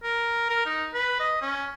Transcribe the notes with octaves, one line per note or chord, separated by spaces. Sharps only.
A#4
A#4
D#4
B4
D#5
C#4